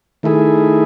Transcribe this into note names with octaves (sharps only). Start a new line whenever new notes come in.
D#3 A3 E4 G#4